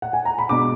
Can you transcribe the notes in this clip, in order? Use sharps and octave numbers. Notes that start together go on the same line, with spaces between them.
F#5
G#5
A#5
B5
B2 G#3 D4 D6